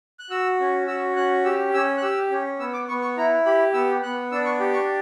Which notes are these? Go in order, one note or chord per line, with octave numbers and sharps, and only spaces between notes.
F#6
F#4 E6
C#4
F#4 E6
C#4 F#6
G4 E6
C#4 E6
F#6
G4 E6
C#4
B3 E6
D6
B3 C#6
C#6
E4 A#5
G4 B5
B3 E6
B3 F#6
D4 E6
C#6
G4
C#6